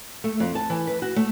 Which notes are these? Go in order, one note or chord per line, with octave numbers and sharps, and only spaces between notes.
A3
F2
A5
E3
B4
F#4
A3